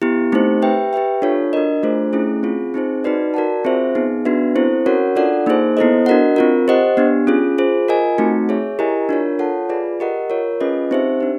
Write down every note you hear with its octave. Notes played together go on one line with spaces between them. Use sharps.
B3 E4 G4
A3 C4 D#4 G4 C5
G4 B4 E5 G5
G4 B4 E5 G5
D4 F4 A4 C#5
D4 F#4 A#4 D#5
A3 D4 F4 G#4 C5
A3 C#4 E4 G#4
C4 F4 G#4
C4 D#4 G#4 C5
D#4 F#4 B4 D5
F#4 A#4 D5 F#5 A5
C4 F4 G#4 C5 E5
B3 D#4 G#4
B3 D4 F#4 B4 E5
C4 E4 A4 C5
C#4 F#4 A#4 C#5 F#5
D4 F4 A4 D5 F#5
A#3 D#4 G#4 C5
B3 E4 A4 C5 D#5
D4 F#4 A#4 D#5 F#5
C4 F4 A#4
G4 C5 D#5 F#5
B3 D4 G4
C#4 F4 G#4
F4 G#4 C5
F4 A#4 D#5 G#5
A3 C4 D#4 F#4
G#4 C#5 E5
E4 G4 A#4 D#5 G#5
D4 F4 A#4 C#5
F4 A4 C#5 F#5 A5
F4 G#4 B4 D5
G4 A#4 D#5 F#5
F4 A#4 C#5
C#4 F4 G#4 B4 D#5
C4 D#4 G4 C5 E5
D4 G4